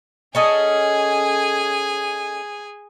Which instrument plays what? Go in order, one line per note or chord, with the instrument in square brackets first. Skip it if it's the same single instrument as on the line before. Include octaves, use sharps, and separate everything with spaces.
[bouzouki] C#4 A4 D#5 [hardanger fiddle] G#4 G#5